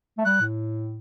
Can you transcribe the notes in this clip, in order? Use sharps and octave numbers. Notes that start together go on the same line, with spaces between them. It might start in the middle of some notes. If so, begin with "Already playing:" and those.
A3
G3 F#6
A2